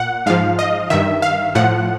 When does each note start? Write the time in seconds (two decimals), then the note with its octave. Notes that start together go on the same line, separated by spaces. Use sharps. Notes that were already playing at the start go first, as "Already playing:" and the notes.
Already playing: A#2 F#5
0.26 G#2 F3 F5
0.59 D#5
0.90 G2 D#3 E5
1.22 F5
1.55 A2 F3 F#5